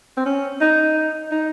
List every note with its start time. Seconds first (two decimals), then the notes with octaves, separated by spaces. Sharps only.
0.17 C4
0.26 C#4
0.61 D#4
1.32 D#4